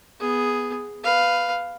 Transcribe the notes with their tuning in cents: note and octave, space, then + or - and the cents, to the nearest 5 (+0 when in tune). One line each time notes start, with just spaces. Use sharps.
B3 +0 G#4 +0
B4 +10 F5 +0